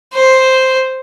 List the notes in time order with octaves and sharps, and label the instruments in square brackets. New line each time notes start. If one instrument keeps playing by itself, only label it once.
[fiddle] C5